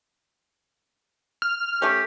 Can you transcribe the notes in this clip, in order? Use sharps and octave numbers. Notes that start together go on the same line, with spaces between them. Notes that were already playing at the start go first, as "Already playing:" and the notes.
F6
A3 C#4 G4